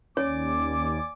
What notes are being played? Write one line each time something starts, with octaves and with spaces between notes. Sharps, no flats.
D#2 C#4 C#5 D5 G#5 D6